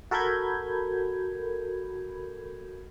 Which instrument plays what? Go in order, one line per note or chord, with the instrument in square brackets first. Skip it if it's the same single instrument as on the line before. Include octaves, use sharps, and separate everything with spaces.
[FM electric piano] F#4 A4 A#4 B5 G6 G#6